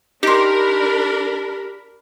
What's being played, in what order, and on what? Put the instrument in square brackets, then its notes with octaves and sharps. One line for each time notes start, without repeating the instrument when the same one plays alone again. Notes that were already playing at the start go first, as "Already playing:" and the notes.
[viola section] D4 A#4 B5 [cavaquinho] D#4 C6 [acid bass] G4